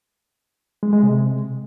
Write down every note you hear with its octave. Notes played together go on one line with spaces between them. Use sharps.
G#3
G#3
C3